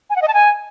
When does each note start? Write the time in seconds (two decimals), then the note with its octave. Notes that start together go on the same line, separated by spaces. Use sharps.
0.10 G#5
0.16 F#5
0.22 D#5
0.28 A5
0.34 G#5